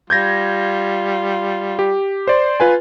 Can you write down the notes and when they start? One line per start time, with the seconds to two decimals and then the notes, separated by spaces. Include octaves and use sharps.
0.10 G3 F4 G6 G#6 A#6
1.79 G4
2.27 C5 D5 C6
2.60 F4 B4 G#5